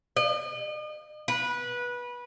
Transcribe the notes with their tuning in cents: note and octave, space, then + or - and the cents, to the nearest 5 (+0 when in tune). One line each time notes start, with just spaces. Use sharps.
D#5 -40
B4 -20